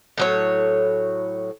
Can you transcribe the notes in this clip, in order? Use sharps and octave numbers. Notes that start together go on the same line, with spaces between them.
A2 F#3 C#5